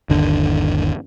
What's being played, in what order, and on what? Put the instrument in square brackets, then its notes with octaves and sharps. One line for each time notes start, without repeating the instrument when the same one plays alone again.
[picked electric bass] G1 D#2 D3